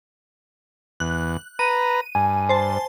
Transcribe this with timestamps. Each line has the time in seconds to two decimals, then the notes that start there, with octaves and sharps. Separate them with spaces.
1.00 E2 F#6
1.59 B4 A#5 D#7
2.15 G2 G#5
2.49 C5 A5